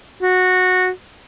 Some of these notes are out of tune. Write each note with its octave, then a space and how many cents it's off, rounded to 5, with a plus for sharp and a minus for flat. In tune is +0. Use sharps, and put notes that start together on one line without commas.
F#4 -10